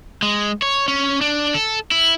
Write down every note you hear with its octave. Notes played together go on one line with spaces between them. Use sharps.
G#3
C#5
C#4
D4
A4
E4